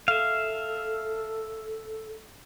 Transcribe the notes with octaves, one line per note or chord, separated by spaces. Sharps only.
A4 E5 F5